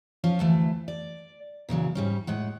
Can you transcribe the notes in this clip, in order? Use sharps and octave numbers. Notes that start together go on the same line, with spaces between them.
F3 C#4 F4
D2 E3 A3
D5
A#2 C#3 E3 F#3
G#2 G3 C#4
A2 G#3 F#5